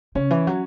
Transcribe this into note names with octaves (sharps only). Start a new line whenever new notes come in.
C#3 C#4
E3
F#3